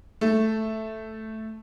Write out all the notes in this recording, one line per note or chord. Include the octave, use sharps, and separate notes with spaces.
A3 A4